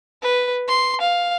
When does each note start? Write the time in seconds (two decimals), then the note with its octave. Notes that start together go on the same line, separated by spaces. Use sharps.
0.22 B4
0.68 C6
1.01 F5